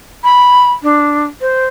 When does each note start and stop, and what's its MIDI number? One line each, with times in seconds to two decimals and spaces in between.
0.24 0.71 83
0.83 1.26 62
1.41 1.66 72